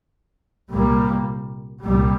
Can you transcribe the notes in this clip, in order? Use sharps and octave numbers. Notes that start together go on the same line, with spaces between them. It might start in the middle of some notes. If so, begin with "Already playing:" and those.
C2 A#2 G3 A#3
C2 A#2 G3